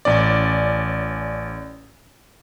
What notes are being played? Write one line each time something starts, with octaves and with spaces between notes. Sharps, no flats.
A1 C#4 D5